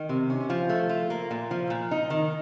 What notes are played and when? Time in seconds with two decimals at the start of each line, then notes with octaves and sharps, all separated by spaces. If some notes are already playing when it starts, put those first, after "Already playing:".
Already playing: D#3
0.09 C3
0.30 C#4
0.50 F3
0.69 A3
0.89 F4
1.10 A#3
1.31 A#2
1.51 F3
1.70 A#2
1.91 D#4
2.10 D#3